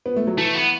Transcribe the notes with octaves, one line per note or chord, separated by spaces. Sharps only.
B3
A3
F#3
E3 A3
B3